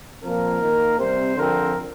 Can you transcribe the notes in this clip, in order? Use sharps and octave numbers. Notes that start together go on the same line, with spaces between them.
A#2 F3 C4 A#4
D#3 A#3
C3 G3 C4 C5
D3 F3 C4 A#4